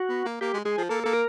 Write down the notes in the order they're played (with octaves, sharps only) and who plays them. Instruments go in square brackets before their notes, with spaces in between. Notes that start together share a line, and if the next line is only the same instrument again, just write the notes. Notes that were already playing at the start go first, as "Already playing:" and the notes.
Already playing: [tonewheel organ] F#4
[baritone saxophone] B3
A#3
[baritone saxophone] A#3 [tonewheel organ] G4
[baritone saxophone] G#3
[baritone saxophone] G#3 [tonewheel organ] G#4
[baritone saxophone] F3
[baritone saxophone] A#3 [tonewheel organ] A4
[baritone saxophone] A#3 [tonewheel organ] A4
[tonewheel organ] A#4